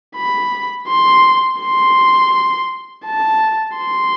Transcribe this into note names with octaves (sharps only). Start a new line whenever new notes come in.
B5
C6
C6
A5
C6